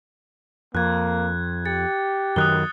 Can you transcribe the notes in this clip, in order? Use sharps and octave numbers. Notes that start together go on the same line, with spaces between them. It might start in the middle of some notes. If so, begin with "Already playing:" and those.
F2 A#3 F#6 G#6
G4 A6 C#7
F#2 D#3 D#6 F#6 G7